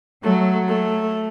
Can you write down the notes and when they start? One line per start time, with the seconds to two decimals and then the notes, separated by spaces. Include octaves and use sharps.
0.23 F#3 A3
0.68 A3